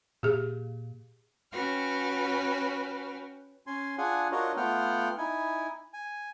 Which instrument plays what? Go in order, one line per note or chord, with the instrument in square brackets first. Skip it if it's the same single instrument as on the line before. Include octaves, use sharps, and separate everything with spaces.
[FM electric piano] A#2 [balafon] G4 G#4
[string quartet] C#4 F#4 B4 G5 F6
[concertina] C#4 G#5 C6
D4 F4 G#4 F#5 G#5
D4 F4 F#4 A#4 C#5 D#5
A3 B3 F4 F#5 G5 F6
D#4 E4 G#5
G#5